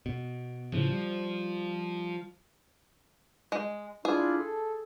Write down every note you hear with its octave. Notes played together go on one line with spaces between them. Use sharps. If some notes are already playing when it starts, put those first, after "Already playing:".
B2
A2 C#3 E3 F3
G3
G#3
D4 E4 F4 G#4
A4